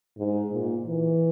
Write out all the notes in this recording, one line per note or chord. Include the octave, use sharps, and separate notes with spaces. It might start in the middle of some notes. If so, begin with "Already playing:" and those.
G#2
A#2
E3